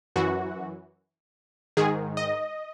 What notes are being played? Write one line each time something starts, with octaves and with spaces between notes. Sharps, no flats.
F#2 E3 F#4
G#2 D#3 G#4
D#5